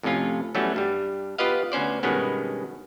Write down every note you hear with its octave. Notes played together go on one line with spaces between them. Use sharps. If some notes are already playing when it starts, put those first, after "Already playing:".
F2 A2 C3 C#4 F4
E3 F#3 G3 A3 B3 C#4
G2 G3
B3 F4 G4 B4 D#5 F5
D2 B3 C#4 C5 D5
G2 B2 D#3 G#3 B3 C#4